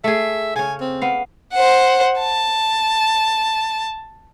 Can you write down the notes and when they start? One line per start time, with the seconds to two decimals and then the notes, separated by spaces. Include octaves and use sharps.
0.04 A3 G#4 E5
0.56 C#3 C#4 G#5
0.81 C4
1.01 B3 F5
1.53 C5 F#5
2.20 A5